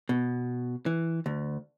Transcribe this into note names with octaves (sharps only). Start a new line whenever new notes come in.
B2
E3
D2